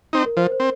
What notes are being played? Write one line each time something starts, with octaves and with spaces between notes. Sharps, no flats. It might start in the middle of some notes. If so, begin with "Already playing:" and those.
C4 D#4
A#4
F3 C5
C5
C4